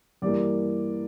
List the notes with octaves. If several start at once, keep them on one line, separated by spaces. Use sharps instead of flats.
G2 E3 G3 A#3 D5